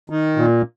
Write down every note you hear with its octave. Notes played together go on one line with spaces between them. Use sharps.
D#3
A#2